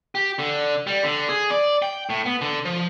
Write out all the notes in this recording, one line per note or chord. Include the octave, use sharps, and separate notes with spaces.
G4
D3
G3
D3
G#4
D5
G5
A2
B3
D3
F3